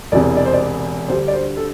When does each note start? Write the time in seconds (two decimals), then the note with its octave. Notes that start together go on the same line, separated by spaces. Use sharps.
0.12 E1 E2 C3 D5
0.37 D5
0.45 C5
0.53 D5
1.08 D2 D3 G3 C5
1.28 D5
1.34 C5
1.57 A4